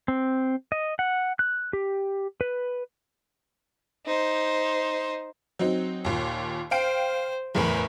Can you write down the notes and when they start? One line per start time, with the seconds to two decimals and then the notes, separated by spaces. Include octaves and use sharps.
0.08 C4
0.72 D#5
0.99 F#5
1.39 F#6
1.73 G4
2.41 B4
4.06 D#4 C5
5.59 F#3 C4 D#4
6.04 D#2 A#2
6.71 C5 F5 G5 D7
7.55 F#1 E2 A2 A#4 B4